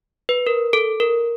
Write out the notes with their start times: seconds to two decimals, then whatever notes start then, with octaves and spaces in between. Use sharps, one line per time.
0.29 B4
0.47 A#4
0.73 A4
1.00 A#4